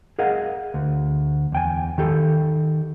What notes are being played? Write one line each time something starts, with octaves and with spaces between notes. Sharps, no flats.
G#4 A#4 D#5 F5 F#5
D2
E2 G5 G#5
D#3 G4 A4